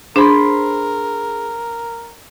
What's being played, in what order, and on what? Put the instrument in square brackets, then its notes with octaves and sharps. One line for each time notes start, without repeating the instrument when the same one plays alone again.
[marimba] D4 [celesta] G#4 [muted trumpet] A#4 [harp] C5 B5 C6